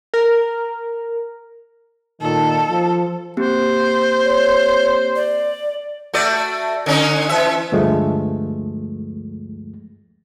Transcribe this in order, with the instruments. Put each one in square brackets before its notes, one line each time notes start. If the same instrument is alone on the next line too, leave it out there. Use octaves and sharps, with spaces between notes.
[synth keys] A#4
[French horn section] A#2 D#3 [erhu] A4
[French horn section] F3
[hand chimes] A#3 C4 G4 [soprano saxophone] C5
[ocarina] C#5
D5
[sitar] A3 F#4 D5
D3 C#4 D#4
E3 E5
[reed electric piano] D2 G2 F3 G#3 A3